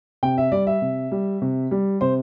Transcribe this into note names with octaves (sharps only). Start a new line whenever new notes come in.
C3 G5
E5
G3 D5
E5
C3
G3
C3
G3
C3 C5